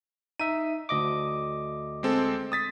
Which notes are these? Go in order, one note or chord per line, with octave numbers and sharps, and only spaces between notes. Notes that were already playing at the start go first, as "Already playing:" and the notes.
D#4 E5 D#7
D2 D#5 D6
G#3 C4 A4
D#6 A6 B6